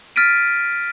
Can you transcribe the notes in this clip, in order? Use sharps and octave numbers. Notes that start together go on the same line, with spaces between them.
F6 A6 B6 D7 D#7